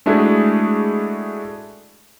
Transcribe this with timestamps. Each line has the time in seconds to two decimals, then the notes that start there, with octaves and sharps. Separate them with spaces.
0.06 G#3 A3 D4 E4 F#4 G#4